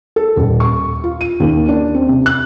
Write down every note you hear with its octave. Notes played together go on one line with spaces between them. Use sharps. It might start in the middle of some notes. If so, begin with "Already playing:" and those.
A4
D#1
C#6
F4
D#7
D#2
D4
C4
C3
F#6